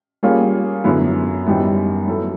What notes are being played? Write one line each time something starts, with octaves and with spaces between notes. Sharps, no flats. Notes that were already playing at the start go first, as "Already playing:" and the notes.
G3 A#3 C#4 F4 G#4
F#2 D3 F#3 B3 E4
F#2 D#3 G3 B3 E4
F#3 B3 E4 A4